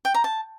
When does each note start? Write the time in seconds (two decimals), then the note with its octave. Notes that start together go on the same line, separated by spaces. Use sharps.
0.05 G5
0.14 A#5
0.24 A5